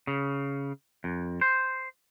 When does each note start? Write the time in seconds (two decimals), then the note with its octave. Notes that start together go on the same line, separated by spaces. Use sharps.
0.07 C#3
1.04 F2
1.41 C5